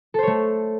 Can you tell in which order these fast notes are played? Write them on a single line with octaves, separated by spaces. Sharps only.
A4 C5 C#5 A3